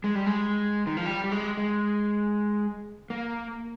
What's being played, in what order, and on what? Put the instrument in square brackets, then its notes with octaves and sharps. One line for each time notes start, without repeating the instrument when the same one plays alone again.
[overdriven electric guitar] G#3
G3
G#3
D#3
F3
G3
G3
G#3
G#3
A#3